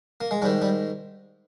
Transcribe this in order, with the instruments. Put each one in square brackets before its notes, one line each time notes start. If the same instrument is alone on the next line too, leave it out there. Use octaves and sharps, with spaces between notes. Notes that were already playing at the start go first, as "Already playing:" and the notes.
[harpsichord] A#3
G#3
G#2 G3
D#3
G3